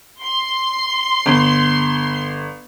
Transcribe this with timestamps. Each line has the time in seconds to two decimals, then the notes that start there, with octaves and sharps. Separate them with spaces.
0.22 C6
1.26 G1